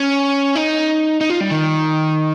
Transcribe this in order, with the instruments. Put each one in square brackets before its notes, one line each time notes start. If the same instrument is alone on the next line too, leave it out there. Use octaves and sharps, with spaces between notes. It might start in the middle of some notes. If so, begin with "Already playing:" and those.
Already playing: [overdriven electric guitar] C#4
D#4
D#4
F4
G3
D#3